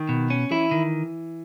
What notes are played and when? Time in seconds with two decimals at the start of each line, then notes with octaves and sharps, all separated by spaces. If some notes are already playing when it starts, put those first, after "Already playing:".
Already playing: D#3
0.09 B2
0.30 C#4
0.51 E3 E4
0.71 D#3